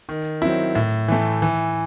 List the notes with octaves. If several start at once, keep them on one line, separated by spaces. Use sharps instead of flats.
D#3
F#3 C4 E4
A2
E3 A3
E3